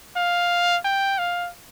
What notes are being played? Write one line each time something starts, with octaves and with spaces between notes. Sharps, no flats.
F5
G5
F5